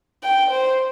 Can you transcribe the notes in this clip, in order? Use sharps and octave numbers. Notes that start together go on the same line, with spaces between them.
G5
C5